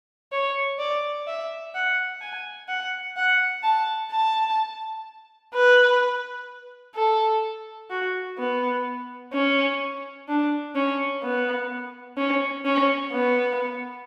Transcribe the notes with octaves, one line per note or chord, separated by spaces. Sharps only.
C#5
D5
E5
F#5
G#5
F#5
F#5
A5
A5
B4
A4
F#4
B3
C#4
D4
C#4
B3
C#4
C#4
B3